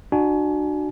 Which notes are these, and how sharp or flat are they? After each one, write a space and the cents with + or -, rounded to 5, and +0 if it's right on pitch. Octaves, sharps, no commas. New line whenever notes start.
D4 +35 F#4 +0 G#5 +30